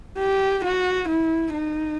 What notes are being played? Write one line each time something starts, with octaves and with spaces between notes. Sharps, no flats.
G4
F#4
E4
D#4